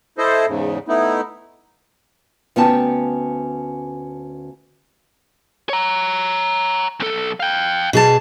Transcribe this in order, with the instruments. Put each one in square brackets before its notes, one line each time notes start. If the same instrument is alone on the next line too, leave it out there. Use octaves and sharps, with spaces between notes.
[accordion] E4 A4 C5 D#5
E2 G#2 C#3
A3 B3 D#4 E4
[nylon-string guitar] D2 B3 C#4 G5 A5
[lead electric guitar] C#5 A#5
B1 A4
F5 G5
[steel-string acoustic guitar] B2 G#4 A5